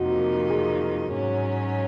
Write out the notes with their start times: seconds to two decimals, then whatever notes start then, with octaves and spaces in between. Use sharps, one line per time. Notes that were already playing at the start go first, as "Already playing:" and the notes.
Already playing: F2 C3 D#3 A#3 D#4 F#4
0.50 G#4
1.13 G#2 F#3 C#4